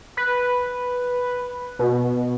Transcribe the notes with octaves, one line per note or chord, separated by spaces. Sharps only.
B4
B2